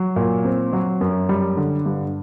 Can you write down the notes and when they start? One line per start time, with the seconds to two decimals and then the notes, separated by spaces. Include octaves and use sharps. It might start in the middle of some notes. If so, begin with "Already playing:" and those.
Already playing: F#3
0.16 A#2
0.45 C4
0.73 F#3
1.01 F#2
1.29 G3
1.57 D3
1.86 G2